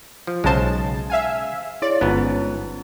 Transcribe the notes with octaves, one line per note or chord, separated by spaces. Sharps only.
F3
B1 C#3 G#3 C5 A5
E5 F5 G#5
E4 C#5 D5 A6
G1 G#2 B3 C#4 F4